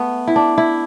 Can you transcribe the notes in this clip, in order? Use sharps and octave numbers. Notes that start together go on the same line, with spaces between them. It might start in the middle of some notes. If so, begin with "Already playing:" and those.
Already playing: A3 B3
E4
D4
E4